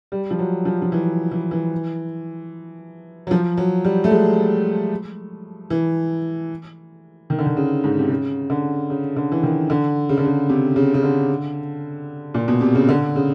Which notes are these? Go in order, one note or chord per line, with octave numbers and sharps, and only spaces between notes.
G3
F3
F#3
F3
F3
E3
E3
E3
F#3
F3
F#3
G3
A3
G#3
E3
D#3
D3
D#3
C#3
G#2
C3
C#3
D3
C#3
D3
E3
D#3
D3
C#3
D3
C#3
C3
C#3
C#3
D3
A#2
B2
C3
C#3
D3
C#3